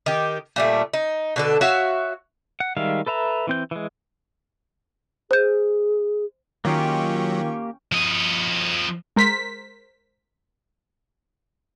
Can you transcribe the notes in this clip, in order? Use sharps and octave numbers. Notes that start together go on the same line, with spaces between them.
D#3 G4
A#2 G3 A3
D#4
B2 D3 A4
F#4 C#5 E5 F5
F#5
D#3 G3 G#3 E5 F5
A4 B4 E5 A#5
E3 C4 G6
E3 G#3
G#4 C5 G6
D#3 F#3 A#3 C#4 F4 G4 G5 C#6
F3 D#5
G#3 A#4 C5 B6